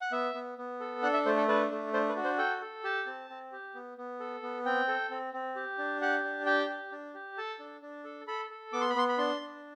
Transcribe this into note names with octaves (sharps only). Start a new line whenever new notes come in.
F#5
B3 E5
B3
B3
A4
D4 F#5
E5
A3 C5
A4
D4 B4
A3
D4 C5
B4
F#4
C5
A4 G5
A4
G4 A5
C4
C4
G4
B3
B3
A4
B3
C4 G5
A4
C4
C4
G4
D4
G4 F#5
D4
G4 G5
G4
D4
G4
A4 A5
D4
D4
A4
A4 B5
A4
B3 D6
C6
B5
B3 C6
B5
D4 C6
D4